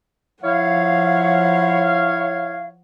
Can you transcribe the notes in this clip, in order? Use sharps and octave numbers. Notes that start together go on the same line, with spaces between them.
F3 E4 C#5 F5 F#5